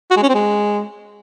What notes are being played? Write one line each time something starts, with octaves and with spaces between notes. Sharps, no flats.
F#4
G#3
C#4
C4
G#3